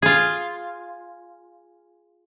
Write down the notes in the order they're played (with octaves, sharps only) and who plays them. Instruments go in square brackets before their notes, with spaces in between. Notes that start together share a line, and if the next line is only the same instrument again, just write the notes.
[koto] F4 G#4